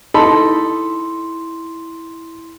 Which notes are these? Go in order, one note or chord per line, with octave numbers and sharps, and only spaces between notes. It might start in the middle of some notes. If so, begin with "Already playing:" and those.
D#4 E4 A4 B5 C6